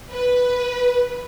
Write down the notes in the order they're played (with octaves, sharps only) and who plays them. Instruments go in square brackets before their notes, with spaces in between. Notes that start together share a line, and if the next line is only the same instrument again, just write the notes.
[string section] B4